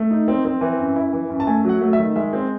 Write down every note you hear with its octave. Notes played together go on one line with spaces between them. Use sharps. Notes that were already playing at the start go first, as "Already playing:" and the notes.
Already playing: A3
D#4
C4
C4
E3
F#2
E4
E3
F#2
A5
A3 G#5
F#3 F#5
A3
E5
D#3
G#3 E5
C4